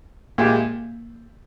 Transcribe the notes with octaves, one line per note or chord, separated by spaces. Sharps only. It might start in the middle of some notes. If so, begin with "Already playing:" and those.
A#2 G#3 A#3 E4 G4